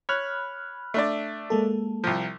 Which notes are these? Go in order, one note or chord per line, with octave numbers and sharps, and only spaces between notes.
C#5 B5 F6 F#6
A3 D4 D5
G#3 A#3 A4
C2 F3